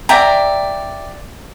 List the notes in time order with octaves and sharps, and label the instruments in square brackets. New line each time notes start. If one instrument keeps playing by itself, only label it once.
[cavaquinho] D5 E5 G5 A#5